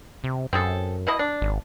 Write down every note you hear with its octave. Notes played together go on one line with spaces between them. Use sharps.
C3
F#2 C4 G#4 A4
B2 E4 D#5
D4
G#1